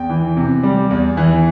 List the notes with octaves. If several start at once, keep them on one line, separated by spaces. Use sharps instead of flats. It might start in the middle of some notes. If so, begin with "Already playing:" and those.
Already playing: E2 G5
E3
C3
G3
E2
E3